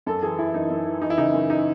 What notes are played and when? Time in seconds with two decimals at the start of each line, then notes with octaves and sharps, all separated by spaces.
0.06 F#2 A4
0.22 E3 G#4
0.38 E3 E4
0.54 F#2 D#4
0.70 F#2
0.86 E3
1.02 E3 D#4
1.10 E4
1.18 C#3 D#4
1.34 F#2
1.50 D#4